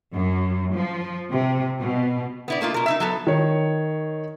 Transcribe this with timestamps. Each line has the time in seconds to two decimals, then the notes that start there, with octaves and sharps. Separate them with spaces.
0.14 F#2
0.75 F3
1.33 C3
1.83 B2
2.48 B3 E4 D5
2.61 A3 A#3 D#4 F4
2.74 B2 A#4
2.86 D#4 E4 E5
3.00 F#3 B3 A4
3.27 D#3 C#5